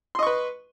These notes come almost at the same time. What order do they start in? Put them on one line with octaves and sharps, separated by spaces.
C6 D#5 C#6 B4